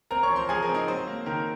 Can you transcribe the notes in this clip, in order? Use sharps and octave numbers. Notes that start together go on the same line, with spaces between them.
C4 A#4 A#5
C#5 C#6
F3
C5 C6
F3 G#4 G#5
A#4
C4
D#4 D#5
F#3 C5
A#3
D#3 A#4